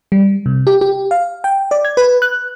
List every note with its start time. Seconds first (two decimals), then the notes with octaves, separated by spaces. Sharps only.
0.12 G3
0.46 C3
0.67 G4
0.81 G4
1.11 F5
1.44 G5
1.71 D5
1.85 G#6
1.97 B4
2.22 F#6